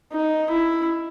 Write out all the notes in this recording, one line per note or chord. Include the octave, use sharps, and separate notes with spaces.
D#4
E4